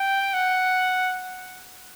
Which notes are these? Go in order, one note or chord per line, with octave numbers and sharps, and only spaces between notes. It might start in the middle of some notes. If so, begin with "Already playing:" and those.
Already playing: G5
F#5